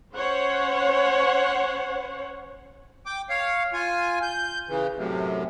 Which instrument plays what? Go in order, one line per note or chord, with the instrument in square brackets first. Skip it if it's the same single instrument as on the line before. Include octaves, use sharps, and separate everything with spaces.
[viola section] C#4 C5 C#5 F#5
[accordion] G5 D6
C#5 F5
F4 G#5
G6
C#3 E3
F#2 A2 C3